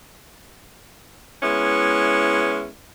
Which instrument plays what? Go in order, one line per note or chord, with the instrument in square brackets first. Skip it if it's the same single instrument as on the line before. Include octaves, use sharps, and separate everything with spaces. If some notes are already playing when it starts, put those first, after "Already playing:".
[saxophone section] G#3 B3 C#4 E4